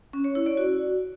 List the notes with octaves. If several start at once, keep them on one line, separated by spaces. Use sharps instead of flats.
C#4
C#5
E4
D5
F#4